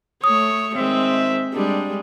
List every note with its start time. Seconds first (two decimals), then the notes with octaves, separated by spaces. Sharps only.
0.24 A3 C#5 D#6
0.76 D#3 G#3 C4 C5 E5
1.54 G3 G#3 A#3 D4 D5